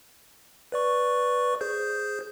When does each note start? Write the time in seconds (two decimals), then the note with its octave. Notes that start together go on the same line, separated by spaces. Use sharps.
0.72 B4 D5 C#6
1.61 G#4 C5 G6